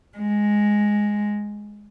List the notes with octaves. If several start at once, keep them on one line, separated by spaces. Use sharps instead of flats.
G#3